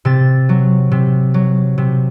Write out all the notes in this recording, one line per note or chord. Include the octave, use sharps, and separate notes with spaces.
C3 A6
F#3
C3
F#3
C3